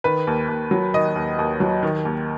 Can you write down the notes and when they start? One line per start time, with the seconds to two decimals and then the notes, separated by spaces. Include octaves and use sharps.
0.04 D#3 B4
0.27 D#2
0.49 D#2
0.71 F#3
0.94 D#3 D#5
1.16 D#2
1.39 D#2
1.60 F#3
1.83 D#3
2.05 D#2